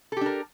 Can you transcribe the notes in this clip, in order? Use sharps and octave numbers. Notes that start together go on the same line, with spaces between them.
D4 G4 A4 A#4